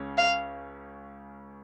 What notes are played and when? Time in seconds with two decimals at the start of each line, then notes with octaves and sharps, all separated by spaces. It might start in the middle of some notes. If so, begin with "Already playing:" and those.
Already playing: C#2 C#3 C#4
0.18 F5